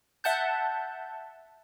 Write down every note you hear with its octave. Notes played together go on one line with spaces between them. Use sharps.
E5 F#5 A5 G6